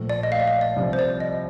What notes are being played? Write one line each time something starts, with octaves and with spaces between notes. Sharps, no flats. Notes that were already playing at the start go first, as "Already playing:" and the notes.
Already playing: A#1 A#2 F3 A3
D5
D#5
F5
D5
D#5
D5
C2 C3 F3
C5
D5
D#5